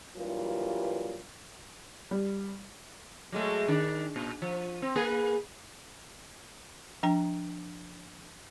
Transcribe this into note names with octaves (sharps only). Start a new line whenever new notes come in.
G2 E3 F#3 G3 A#3 F4
G3
F#3 G#3 A3
D#3 D4
A#2
F3
C4
A#3 G#4 B4
F3 D4 G5 A#5